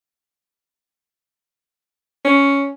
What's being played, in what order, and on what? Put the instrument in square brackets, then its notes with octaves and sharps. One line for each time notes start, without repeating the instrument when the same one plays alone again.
[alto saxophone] C#4